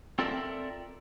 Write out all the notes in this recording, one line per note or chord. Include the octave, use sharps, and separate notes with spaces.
C4 F4 A4 A#4 D5 E5